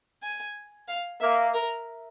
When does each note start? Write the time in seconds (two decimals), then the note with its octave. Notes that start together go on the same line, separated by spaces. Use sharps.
0.23 G#5
0.88 F5
1.20 A#3 E5
1.54 A#4